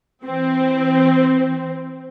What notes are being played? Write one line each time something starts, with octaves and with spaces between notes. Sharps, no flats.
E3 C4